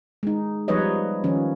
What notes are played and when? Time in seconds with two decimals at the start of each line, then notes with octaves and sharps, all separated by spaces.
0.23 G#3 D#4
0.68 F3 G3 D#4 B4 C#5 D#5
1.24 D#3 F3 C#4